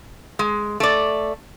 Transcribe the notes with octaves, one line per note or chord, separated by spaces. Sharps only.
G#3
A3 D5